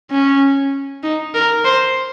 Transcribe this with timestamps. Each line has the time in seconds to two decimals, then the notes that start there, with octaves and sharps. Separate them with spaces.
0.11 C#4
1.03 D#4
1.34 A#4
1.65 C5